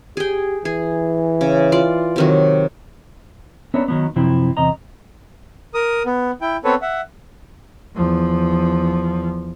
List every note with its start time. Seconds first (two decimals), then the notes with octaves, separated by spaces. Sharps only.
0.17 G4 G#4 G5
0.65 E3 G#4
1.41 C#3
1.72 F4 D5
2.16 C3 D#3 F#3
3.74 B3 C#4 D4 A#4 C#5 E5
3.88 D#3 F#3 B3
4.16 F#2 C3 F3 C4 E4
4.57 E2 C3 D#5 A#5
5.74 A#4 D#6
6.06 B3
6.41 E4 G5
6.64 B3 C4 A4 B4 C#5
6.82 E5 F#5
7.96 E2 F3